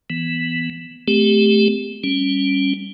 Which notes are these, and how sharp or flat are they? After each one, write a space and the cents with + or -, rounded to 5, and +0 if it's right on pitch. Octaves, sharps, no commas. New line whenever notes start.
E3 +0 B3 +0
A3 -15 C4 -40 G4 +15
G3 +0 C#4 -10